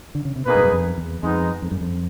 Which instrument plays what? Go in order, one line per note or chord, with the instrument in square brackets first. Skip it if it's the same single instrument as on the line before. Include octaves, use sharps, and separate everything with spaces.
[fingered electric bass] D3
C#3
C3
[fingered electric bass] B2 [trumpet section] A#3 D#4 G#4 B4
[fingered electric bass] G2
F#2
F2
E2
[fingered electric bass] F2 [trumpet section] G#3 B3 D#4
[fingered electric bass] F2
F#2
F2